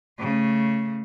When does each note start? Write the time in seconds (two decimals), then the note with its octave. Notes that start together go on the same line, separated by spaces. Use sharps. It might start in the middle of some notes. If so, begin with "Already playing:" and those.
0.20 C#3 A3